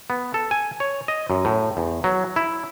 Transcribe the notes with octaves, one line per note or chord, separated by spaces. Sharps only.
B3
A4
G#5
C#5
D#5
F#2
A2
E2
F#3
E4